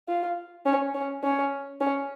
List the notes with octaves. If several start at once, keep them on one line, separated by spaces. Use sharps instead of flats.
F4
C#4
C#4
C#4
C#4